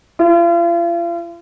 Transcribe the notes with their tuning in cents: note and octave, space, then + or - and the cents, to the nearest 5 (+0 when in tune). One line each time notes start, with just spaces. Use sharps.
F4 -40